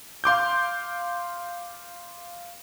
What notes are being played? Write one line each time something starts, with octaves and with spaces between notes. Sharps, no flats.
F5 C6 D6 G6